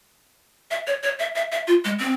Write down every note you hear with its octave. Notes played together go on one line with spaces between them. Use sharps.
E5
C#5
C#5
E5
E5
E5
F4
G#3
C4